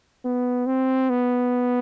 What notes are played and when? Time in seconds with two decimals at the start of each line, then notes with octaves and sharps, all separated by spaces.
0.25 B3
0.66 C4
1.10 B3